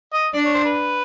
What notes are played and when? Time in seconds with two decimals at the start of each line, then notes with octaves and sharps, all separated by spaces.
0.14 D#5
0.34 D4 D5
0.45 C#5
0.55 C5
0.65 B4